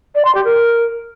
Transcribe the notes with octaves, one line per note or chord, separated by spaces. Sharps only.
D5
C6
G4
A#4